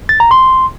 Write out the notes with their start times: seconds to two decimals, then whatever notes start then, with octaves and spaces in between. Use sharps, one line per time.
0.09 A6
0.20 A#5
0.31 C6